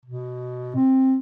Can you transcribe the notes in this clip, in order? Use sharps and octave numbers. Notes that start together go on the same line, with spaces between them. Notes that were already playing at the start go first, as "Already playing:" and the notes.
B2
C4